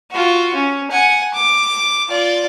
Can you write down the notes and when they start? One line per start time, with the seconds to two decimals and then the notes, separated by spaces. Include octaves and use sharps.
0.11 F4 F#4
0.55 C#4
0.91 F#5 G#5
1.34 D6
2.09 F4 D5